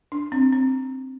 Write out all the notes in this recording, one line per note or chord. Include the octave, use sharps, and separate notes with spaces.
D4
C4
C4